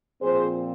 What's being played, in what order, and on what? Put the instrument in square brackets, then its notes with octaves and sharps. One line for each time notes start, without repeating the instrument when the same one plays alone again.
[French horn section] A#2 F3 C4 G#4 C5